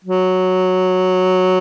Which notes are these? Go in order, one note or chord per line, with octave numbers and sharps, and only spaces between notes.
F#3